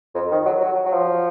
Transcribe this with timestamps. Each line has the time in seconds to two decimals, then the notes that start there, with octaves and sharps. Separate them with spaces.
0.15 F2
0.31 D#3
0.46 F#3
0.61 F#3
0.85 F#3
0.93 F3